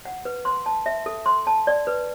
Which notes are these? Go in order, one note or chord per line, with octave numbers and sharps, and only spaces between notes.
F#5
B4
C6
A5
E5
A4
C6
A5
D5
B4